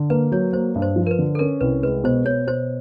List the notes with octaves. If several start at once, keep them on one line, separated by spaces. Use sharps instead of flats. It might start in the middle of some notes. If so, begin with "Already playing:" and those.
Already playing: D3
A#3 B4
F#3 C#5
A#3 C5
G2
C5
F3
A#4
B4
D3
A4
C#4 A#4
C2 B4
G#3 B4
B2 C5
B2 C#5
B2 C5